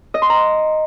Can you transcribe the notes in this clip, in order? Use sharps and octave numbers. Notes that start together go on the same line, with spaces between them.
D#5
C6
A#5